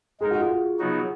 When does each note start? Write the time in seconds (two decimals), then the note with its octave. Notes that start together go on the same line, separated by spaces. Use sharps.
0.21 G#3 D#4 G#4 A#4
0.31 F#4
0.40 F4
0.50 G#4
0.79 C#3 F#3 B3 D#4 F#4